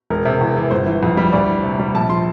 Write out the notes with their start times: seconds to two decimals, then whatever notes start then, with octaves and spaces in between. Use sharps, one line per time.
0.10 E1 A#4
0.25 C3
0.41 E2
0.57 E3
0.71 G1 C5
0.87 E3
1.03 F2
1.17 G3
1.33 D2 D5
1.48 E3
1.63 C3
1.79 G3
1.95 A#1 A5
2.09 F3 C6